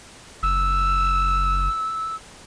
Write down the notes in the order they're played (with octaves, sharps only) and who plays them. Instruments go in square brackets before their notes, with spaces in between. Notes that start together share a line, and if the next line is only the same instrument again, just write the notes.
[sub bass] F#1 [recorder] E6